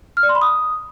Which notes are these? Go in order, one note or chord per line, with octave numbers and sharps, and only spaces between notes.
F6
D5
C6
B5
D#6